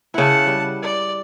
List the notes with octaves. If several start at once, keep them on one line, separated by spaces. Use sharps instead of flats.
C#3 E4 F#5 A5
G3
D5